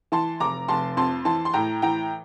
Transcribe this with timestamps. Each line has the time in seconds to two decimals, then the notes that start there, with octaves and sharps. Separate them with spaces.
0.12 E3 A5 C6
0.40 F1 A#5 D6
0.68 F1 A5 C6
0.97 F2 A5 C6
1.25 E3 A5 C6
1.45 C6
1.53 A2 G5 A#5
1.82 E3 G5 A#5